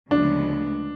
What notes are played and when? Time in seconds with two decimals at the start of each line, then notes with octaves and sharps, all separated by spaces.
0.11 D2 C#3 F3 G#3 B3 D4